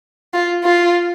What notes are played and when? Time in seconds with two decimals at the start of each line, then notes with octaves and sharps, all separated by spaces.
0.33 F4
0.64 F4